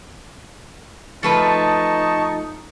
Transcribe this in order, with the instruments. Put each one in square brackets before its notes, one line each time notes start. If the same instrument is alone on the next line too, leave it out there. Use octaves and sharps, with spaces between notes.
[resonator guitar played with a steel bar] F3 A3 B4 [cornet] D#4 [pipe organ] A5 C#6